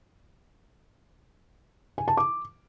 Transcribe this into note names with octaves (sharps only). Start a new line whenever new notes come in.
G#5
A5
D6